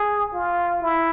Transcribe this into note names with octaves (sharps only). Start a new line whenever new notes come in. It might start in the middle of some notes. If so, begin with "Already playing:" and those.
Already playing: G#4
F4
E4